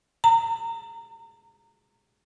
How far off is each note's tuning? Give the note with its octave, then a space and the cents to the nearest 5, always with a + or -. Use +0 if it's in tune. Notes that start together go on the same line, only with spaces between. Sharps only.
A#5 -20